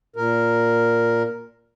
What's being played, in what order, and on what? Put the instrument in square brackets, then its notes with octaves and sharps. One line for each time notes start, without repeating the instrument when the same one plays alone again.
[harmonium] A#2 A#4